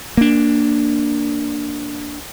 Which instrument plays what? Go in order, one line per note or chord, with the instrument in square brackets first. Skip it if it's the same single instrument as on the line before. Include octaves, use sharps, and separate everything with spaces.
[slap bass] A#3 D4